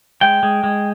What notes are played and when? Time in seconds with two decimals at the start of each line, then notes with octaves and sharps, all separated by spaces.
0.21 G#3 G5
0.43 G#3
0.64 G#3